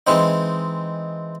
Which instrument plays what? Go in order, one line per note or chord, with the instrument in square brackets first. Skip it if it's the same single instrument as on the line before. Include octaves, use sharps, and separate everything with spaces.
[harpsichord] E3 G#3 C4 D#4